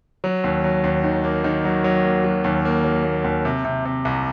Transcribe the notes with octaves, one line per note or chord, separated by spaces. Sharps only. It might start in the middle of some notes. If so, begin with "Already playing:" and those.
F#3
D#2
F#3
D#2
D#3
A#3
D#3
F#3
F#3
A#3
F#3
D#2
A#3
F#3
A#3
D#2
C3
C3
C3
C2